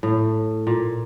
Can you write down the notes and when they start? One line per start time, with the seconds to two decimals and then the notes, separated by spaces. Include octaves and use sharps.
0.03 A2
0.67 A#2